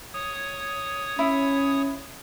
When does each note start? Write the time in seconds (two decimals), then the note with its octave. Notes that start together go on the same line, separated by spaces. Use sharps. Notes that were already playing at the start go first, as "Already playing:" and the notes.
0.14 C#5 D#6
1.19 C#4 E4